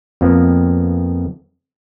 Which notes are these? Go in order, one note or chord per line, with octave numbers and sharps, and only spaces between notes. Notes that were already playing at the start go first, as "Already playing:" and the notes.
F2 F3 A#3 B3